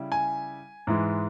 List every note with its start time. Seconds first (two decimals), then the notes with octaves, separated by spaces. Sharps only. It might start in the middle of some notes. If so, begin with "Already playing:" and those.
Already playing: C#3 G3 E4
0.12 G#5
0.87 G#2 E3 G#3